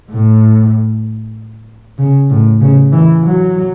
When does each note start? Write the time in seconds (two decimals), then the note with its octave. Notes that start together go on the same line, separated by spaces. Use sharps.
0.11 A2
1.98 C#3
2.30 A2
2.61 C#3
2.93 E3
3.23 F#3